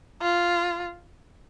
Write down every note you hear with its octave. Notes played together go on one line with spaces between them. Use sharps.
F4